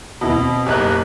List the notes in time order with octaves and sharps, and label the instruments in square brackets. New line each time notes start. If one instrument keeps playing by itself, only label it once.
[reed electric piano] D#2 E4 F#4 [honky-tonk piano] B2
[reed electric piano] C4
[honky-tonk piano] F#1 B1 F#6 [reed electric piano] G4 D#5 A#5